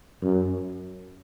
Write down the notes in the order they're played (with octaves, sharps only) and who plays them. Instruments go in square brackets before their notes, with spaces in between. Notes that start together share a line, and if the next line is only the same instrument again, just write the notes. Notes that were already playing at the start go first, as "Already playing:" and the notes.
[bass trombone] F#2